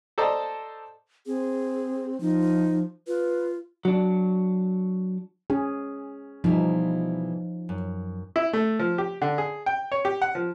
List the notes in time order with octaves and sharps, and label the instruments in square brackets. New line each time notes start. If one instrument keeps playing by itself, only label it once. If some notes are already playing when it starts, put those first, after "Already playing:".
[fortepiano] A4 C5 D5 D#5 A5 A#5
[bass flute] C4 [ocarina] G#4
[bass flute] F3 [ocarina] D#4
[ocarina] F4 [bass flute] B4
[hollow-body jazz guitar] F#3 D4
[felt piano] C#4 [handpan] G#4
[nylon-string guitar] B2 E3 G3 [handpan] F3 D#4
[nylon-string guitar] F#2
[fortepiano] E4
A3
F3
G4
D3
G#4
G5
C#5
G4
F#5
F3